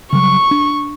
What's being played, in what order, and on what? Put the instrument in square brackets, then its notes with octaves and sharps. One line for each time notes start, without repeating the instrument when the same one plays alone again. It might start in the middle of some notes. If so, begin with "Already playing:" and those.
[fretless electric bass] C#3 F#3 G3 [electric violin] C#6
[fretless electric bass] D4